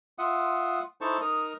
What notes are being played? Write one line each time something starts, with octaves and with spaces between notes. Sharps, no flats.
F4 E5 F#5 D#6
D#4 E4 A4 C5 A5 C#6
D#4 A#4 D#6